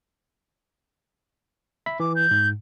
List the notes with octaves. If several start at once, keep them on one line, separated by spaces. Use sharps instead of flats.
E5 B5 B6
E3 D6
G6
G#2